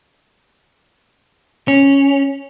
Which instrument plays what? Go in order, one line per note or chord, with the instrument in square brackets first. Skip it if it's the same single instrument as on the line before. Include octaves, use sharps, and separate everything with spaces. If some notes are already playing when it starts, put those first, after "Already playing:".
[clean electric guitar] C#4